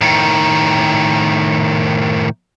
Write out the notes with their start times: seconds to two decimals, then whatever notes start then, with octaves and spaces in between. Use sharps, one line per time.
0.01 A2 D#3